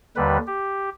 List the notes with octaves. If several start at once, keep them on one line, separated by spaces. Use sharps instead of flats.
D#2 D3 G3 B4
G4